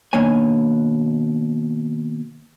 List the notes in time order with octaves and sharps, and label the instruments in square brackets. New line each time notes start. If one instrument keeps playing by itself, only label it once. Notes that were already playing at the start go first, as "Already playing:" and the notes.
[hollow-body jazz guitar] B2 D#3 A#3 D4 C#5 G#5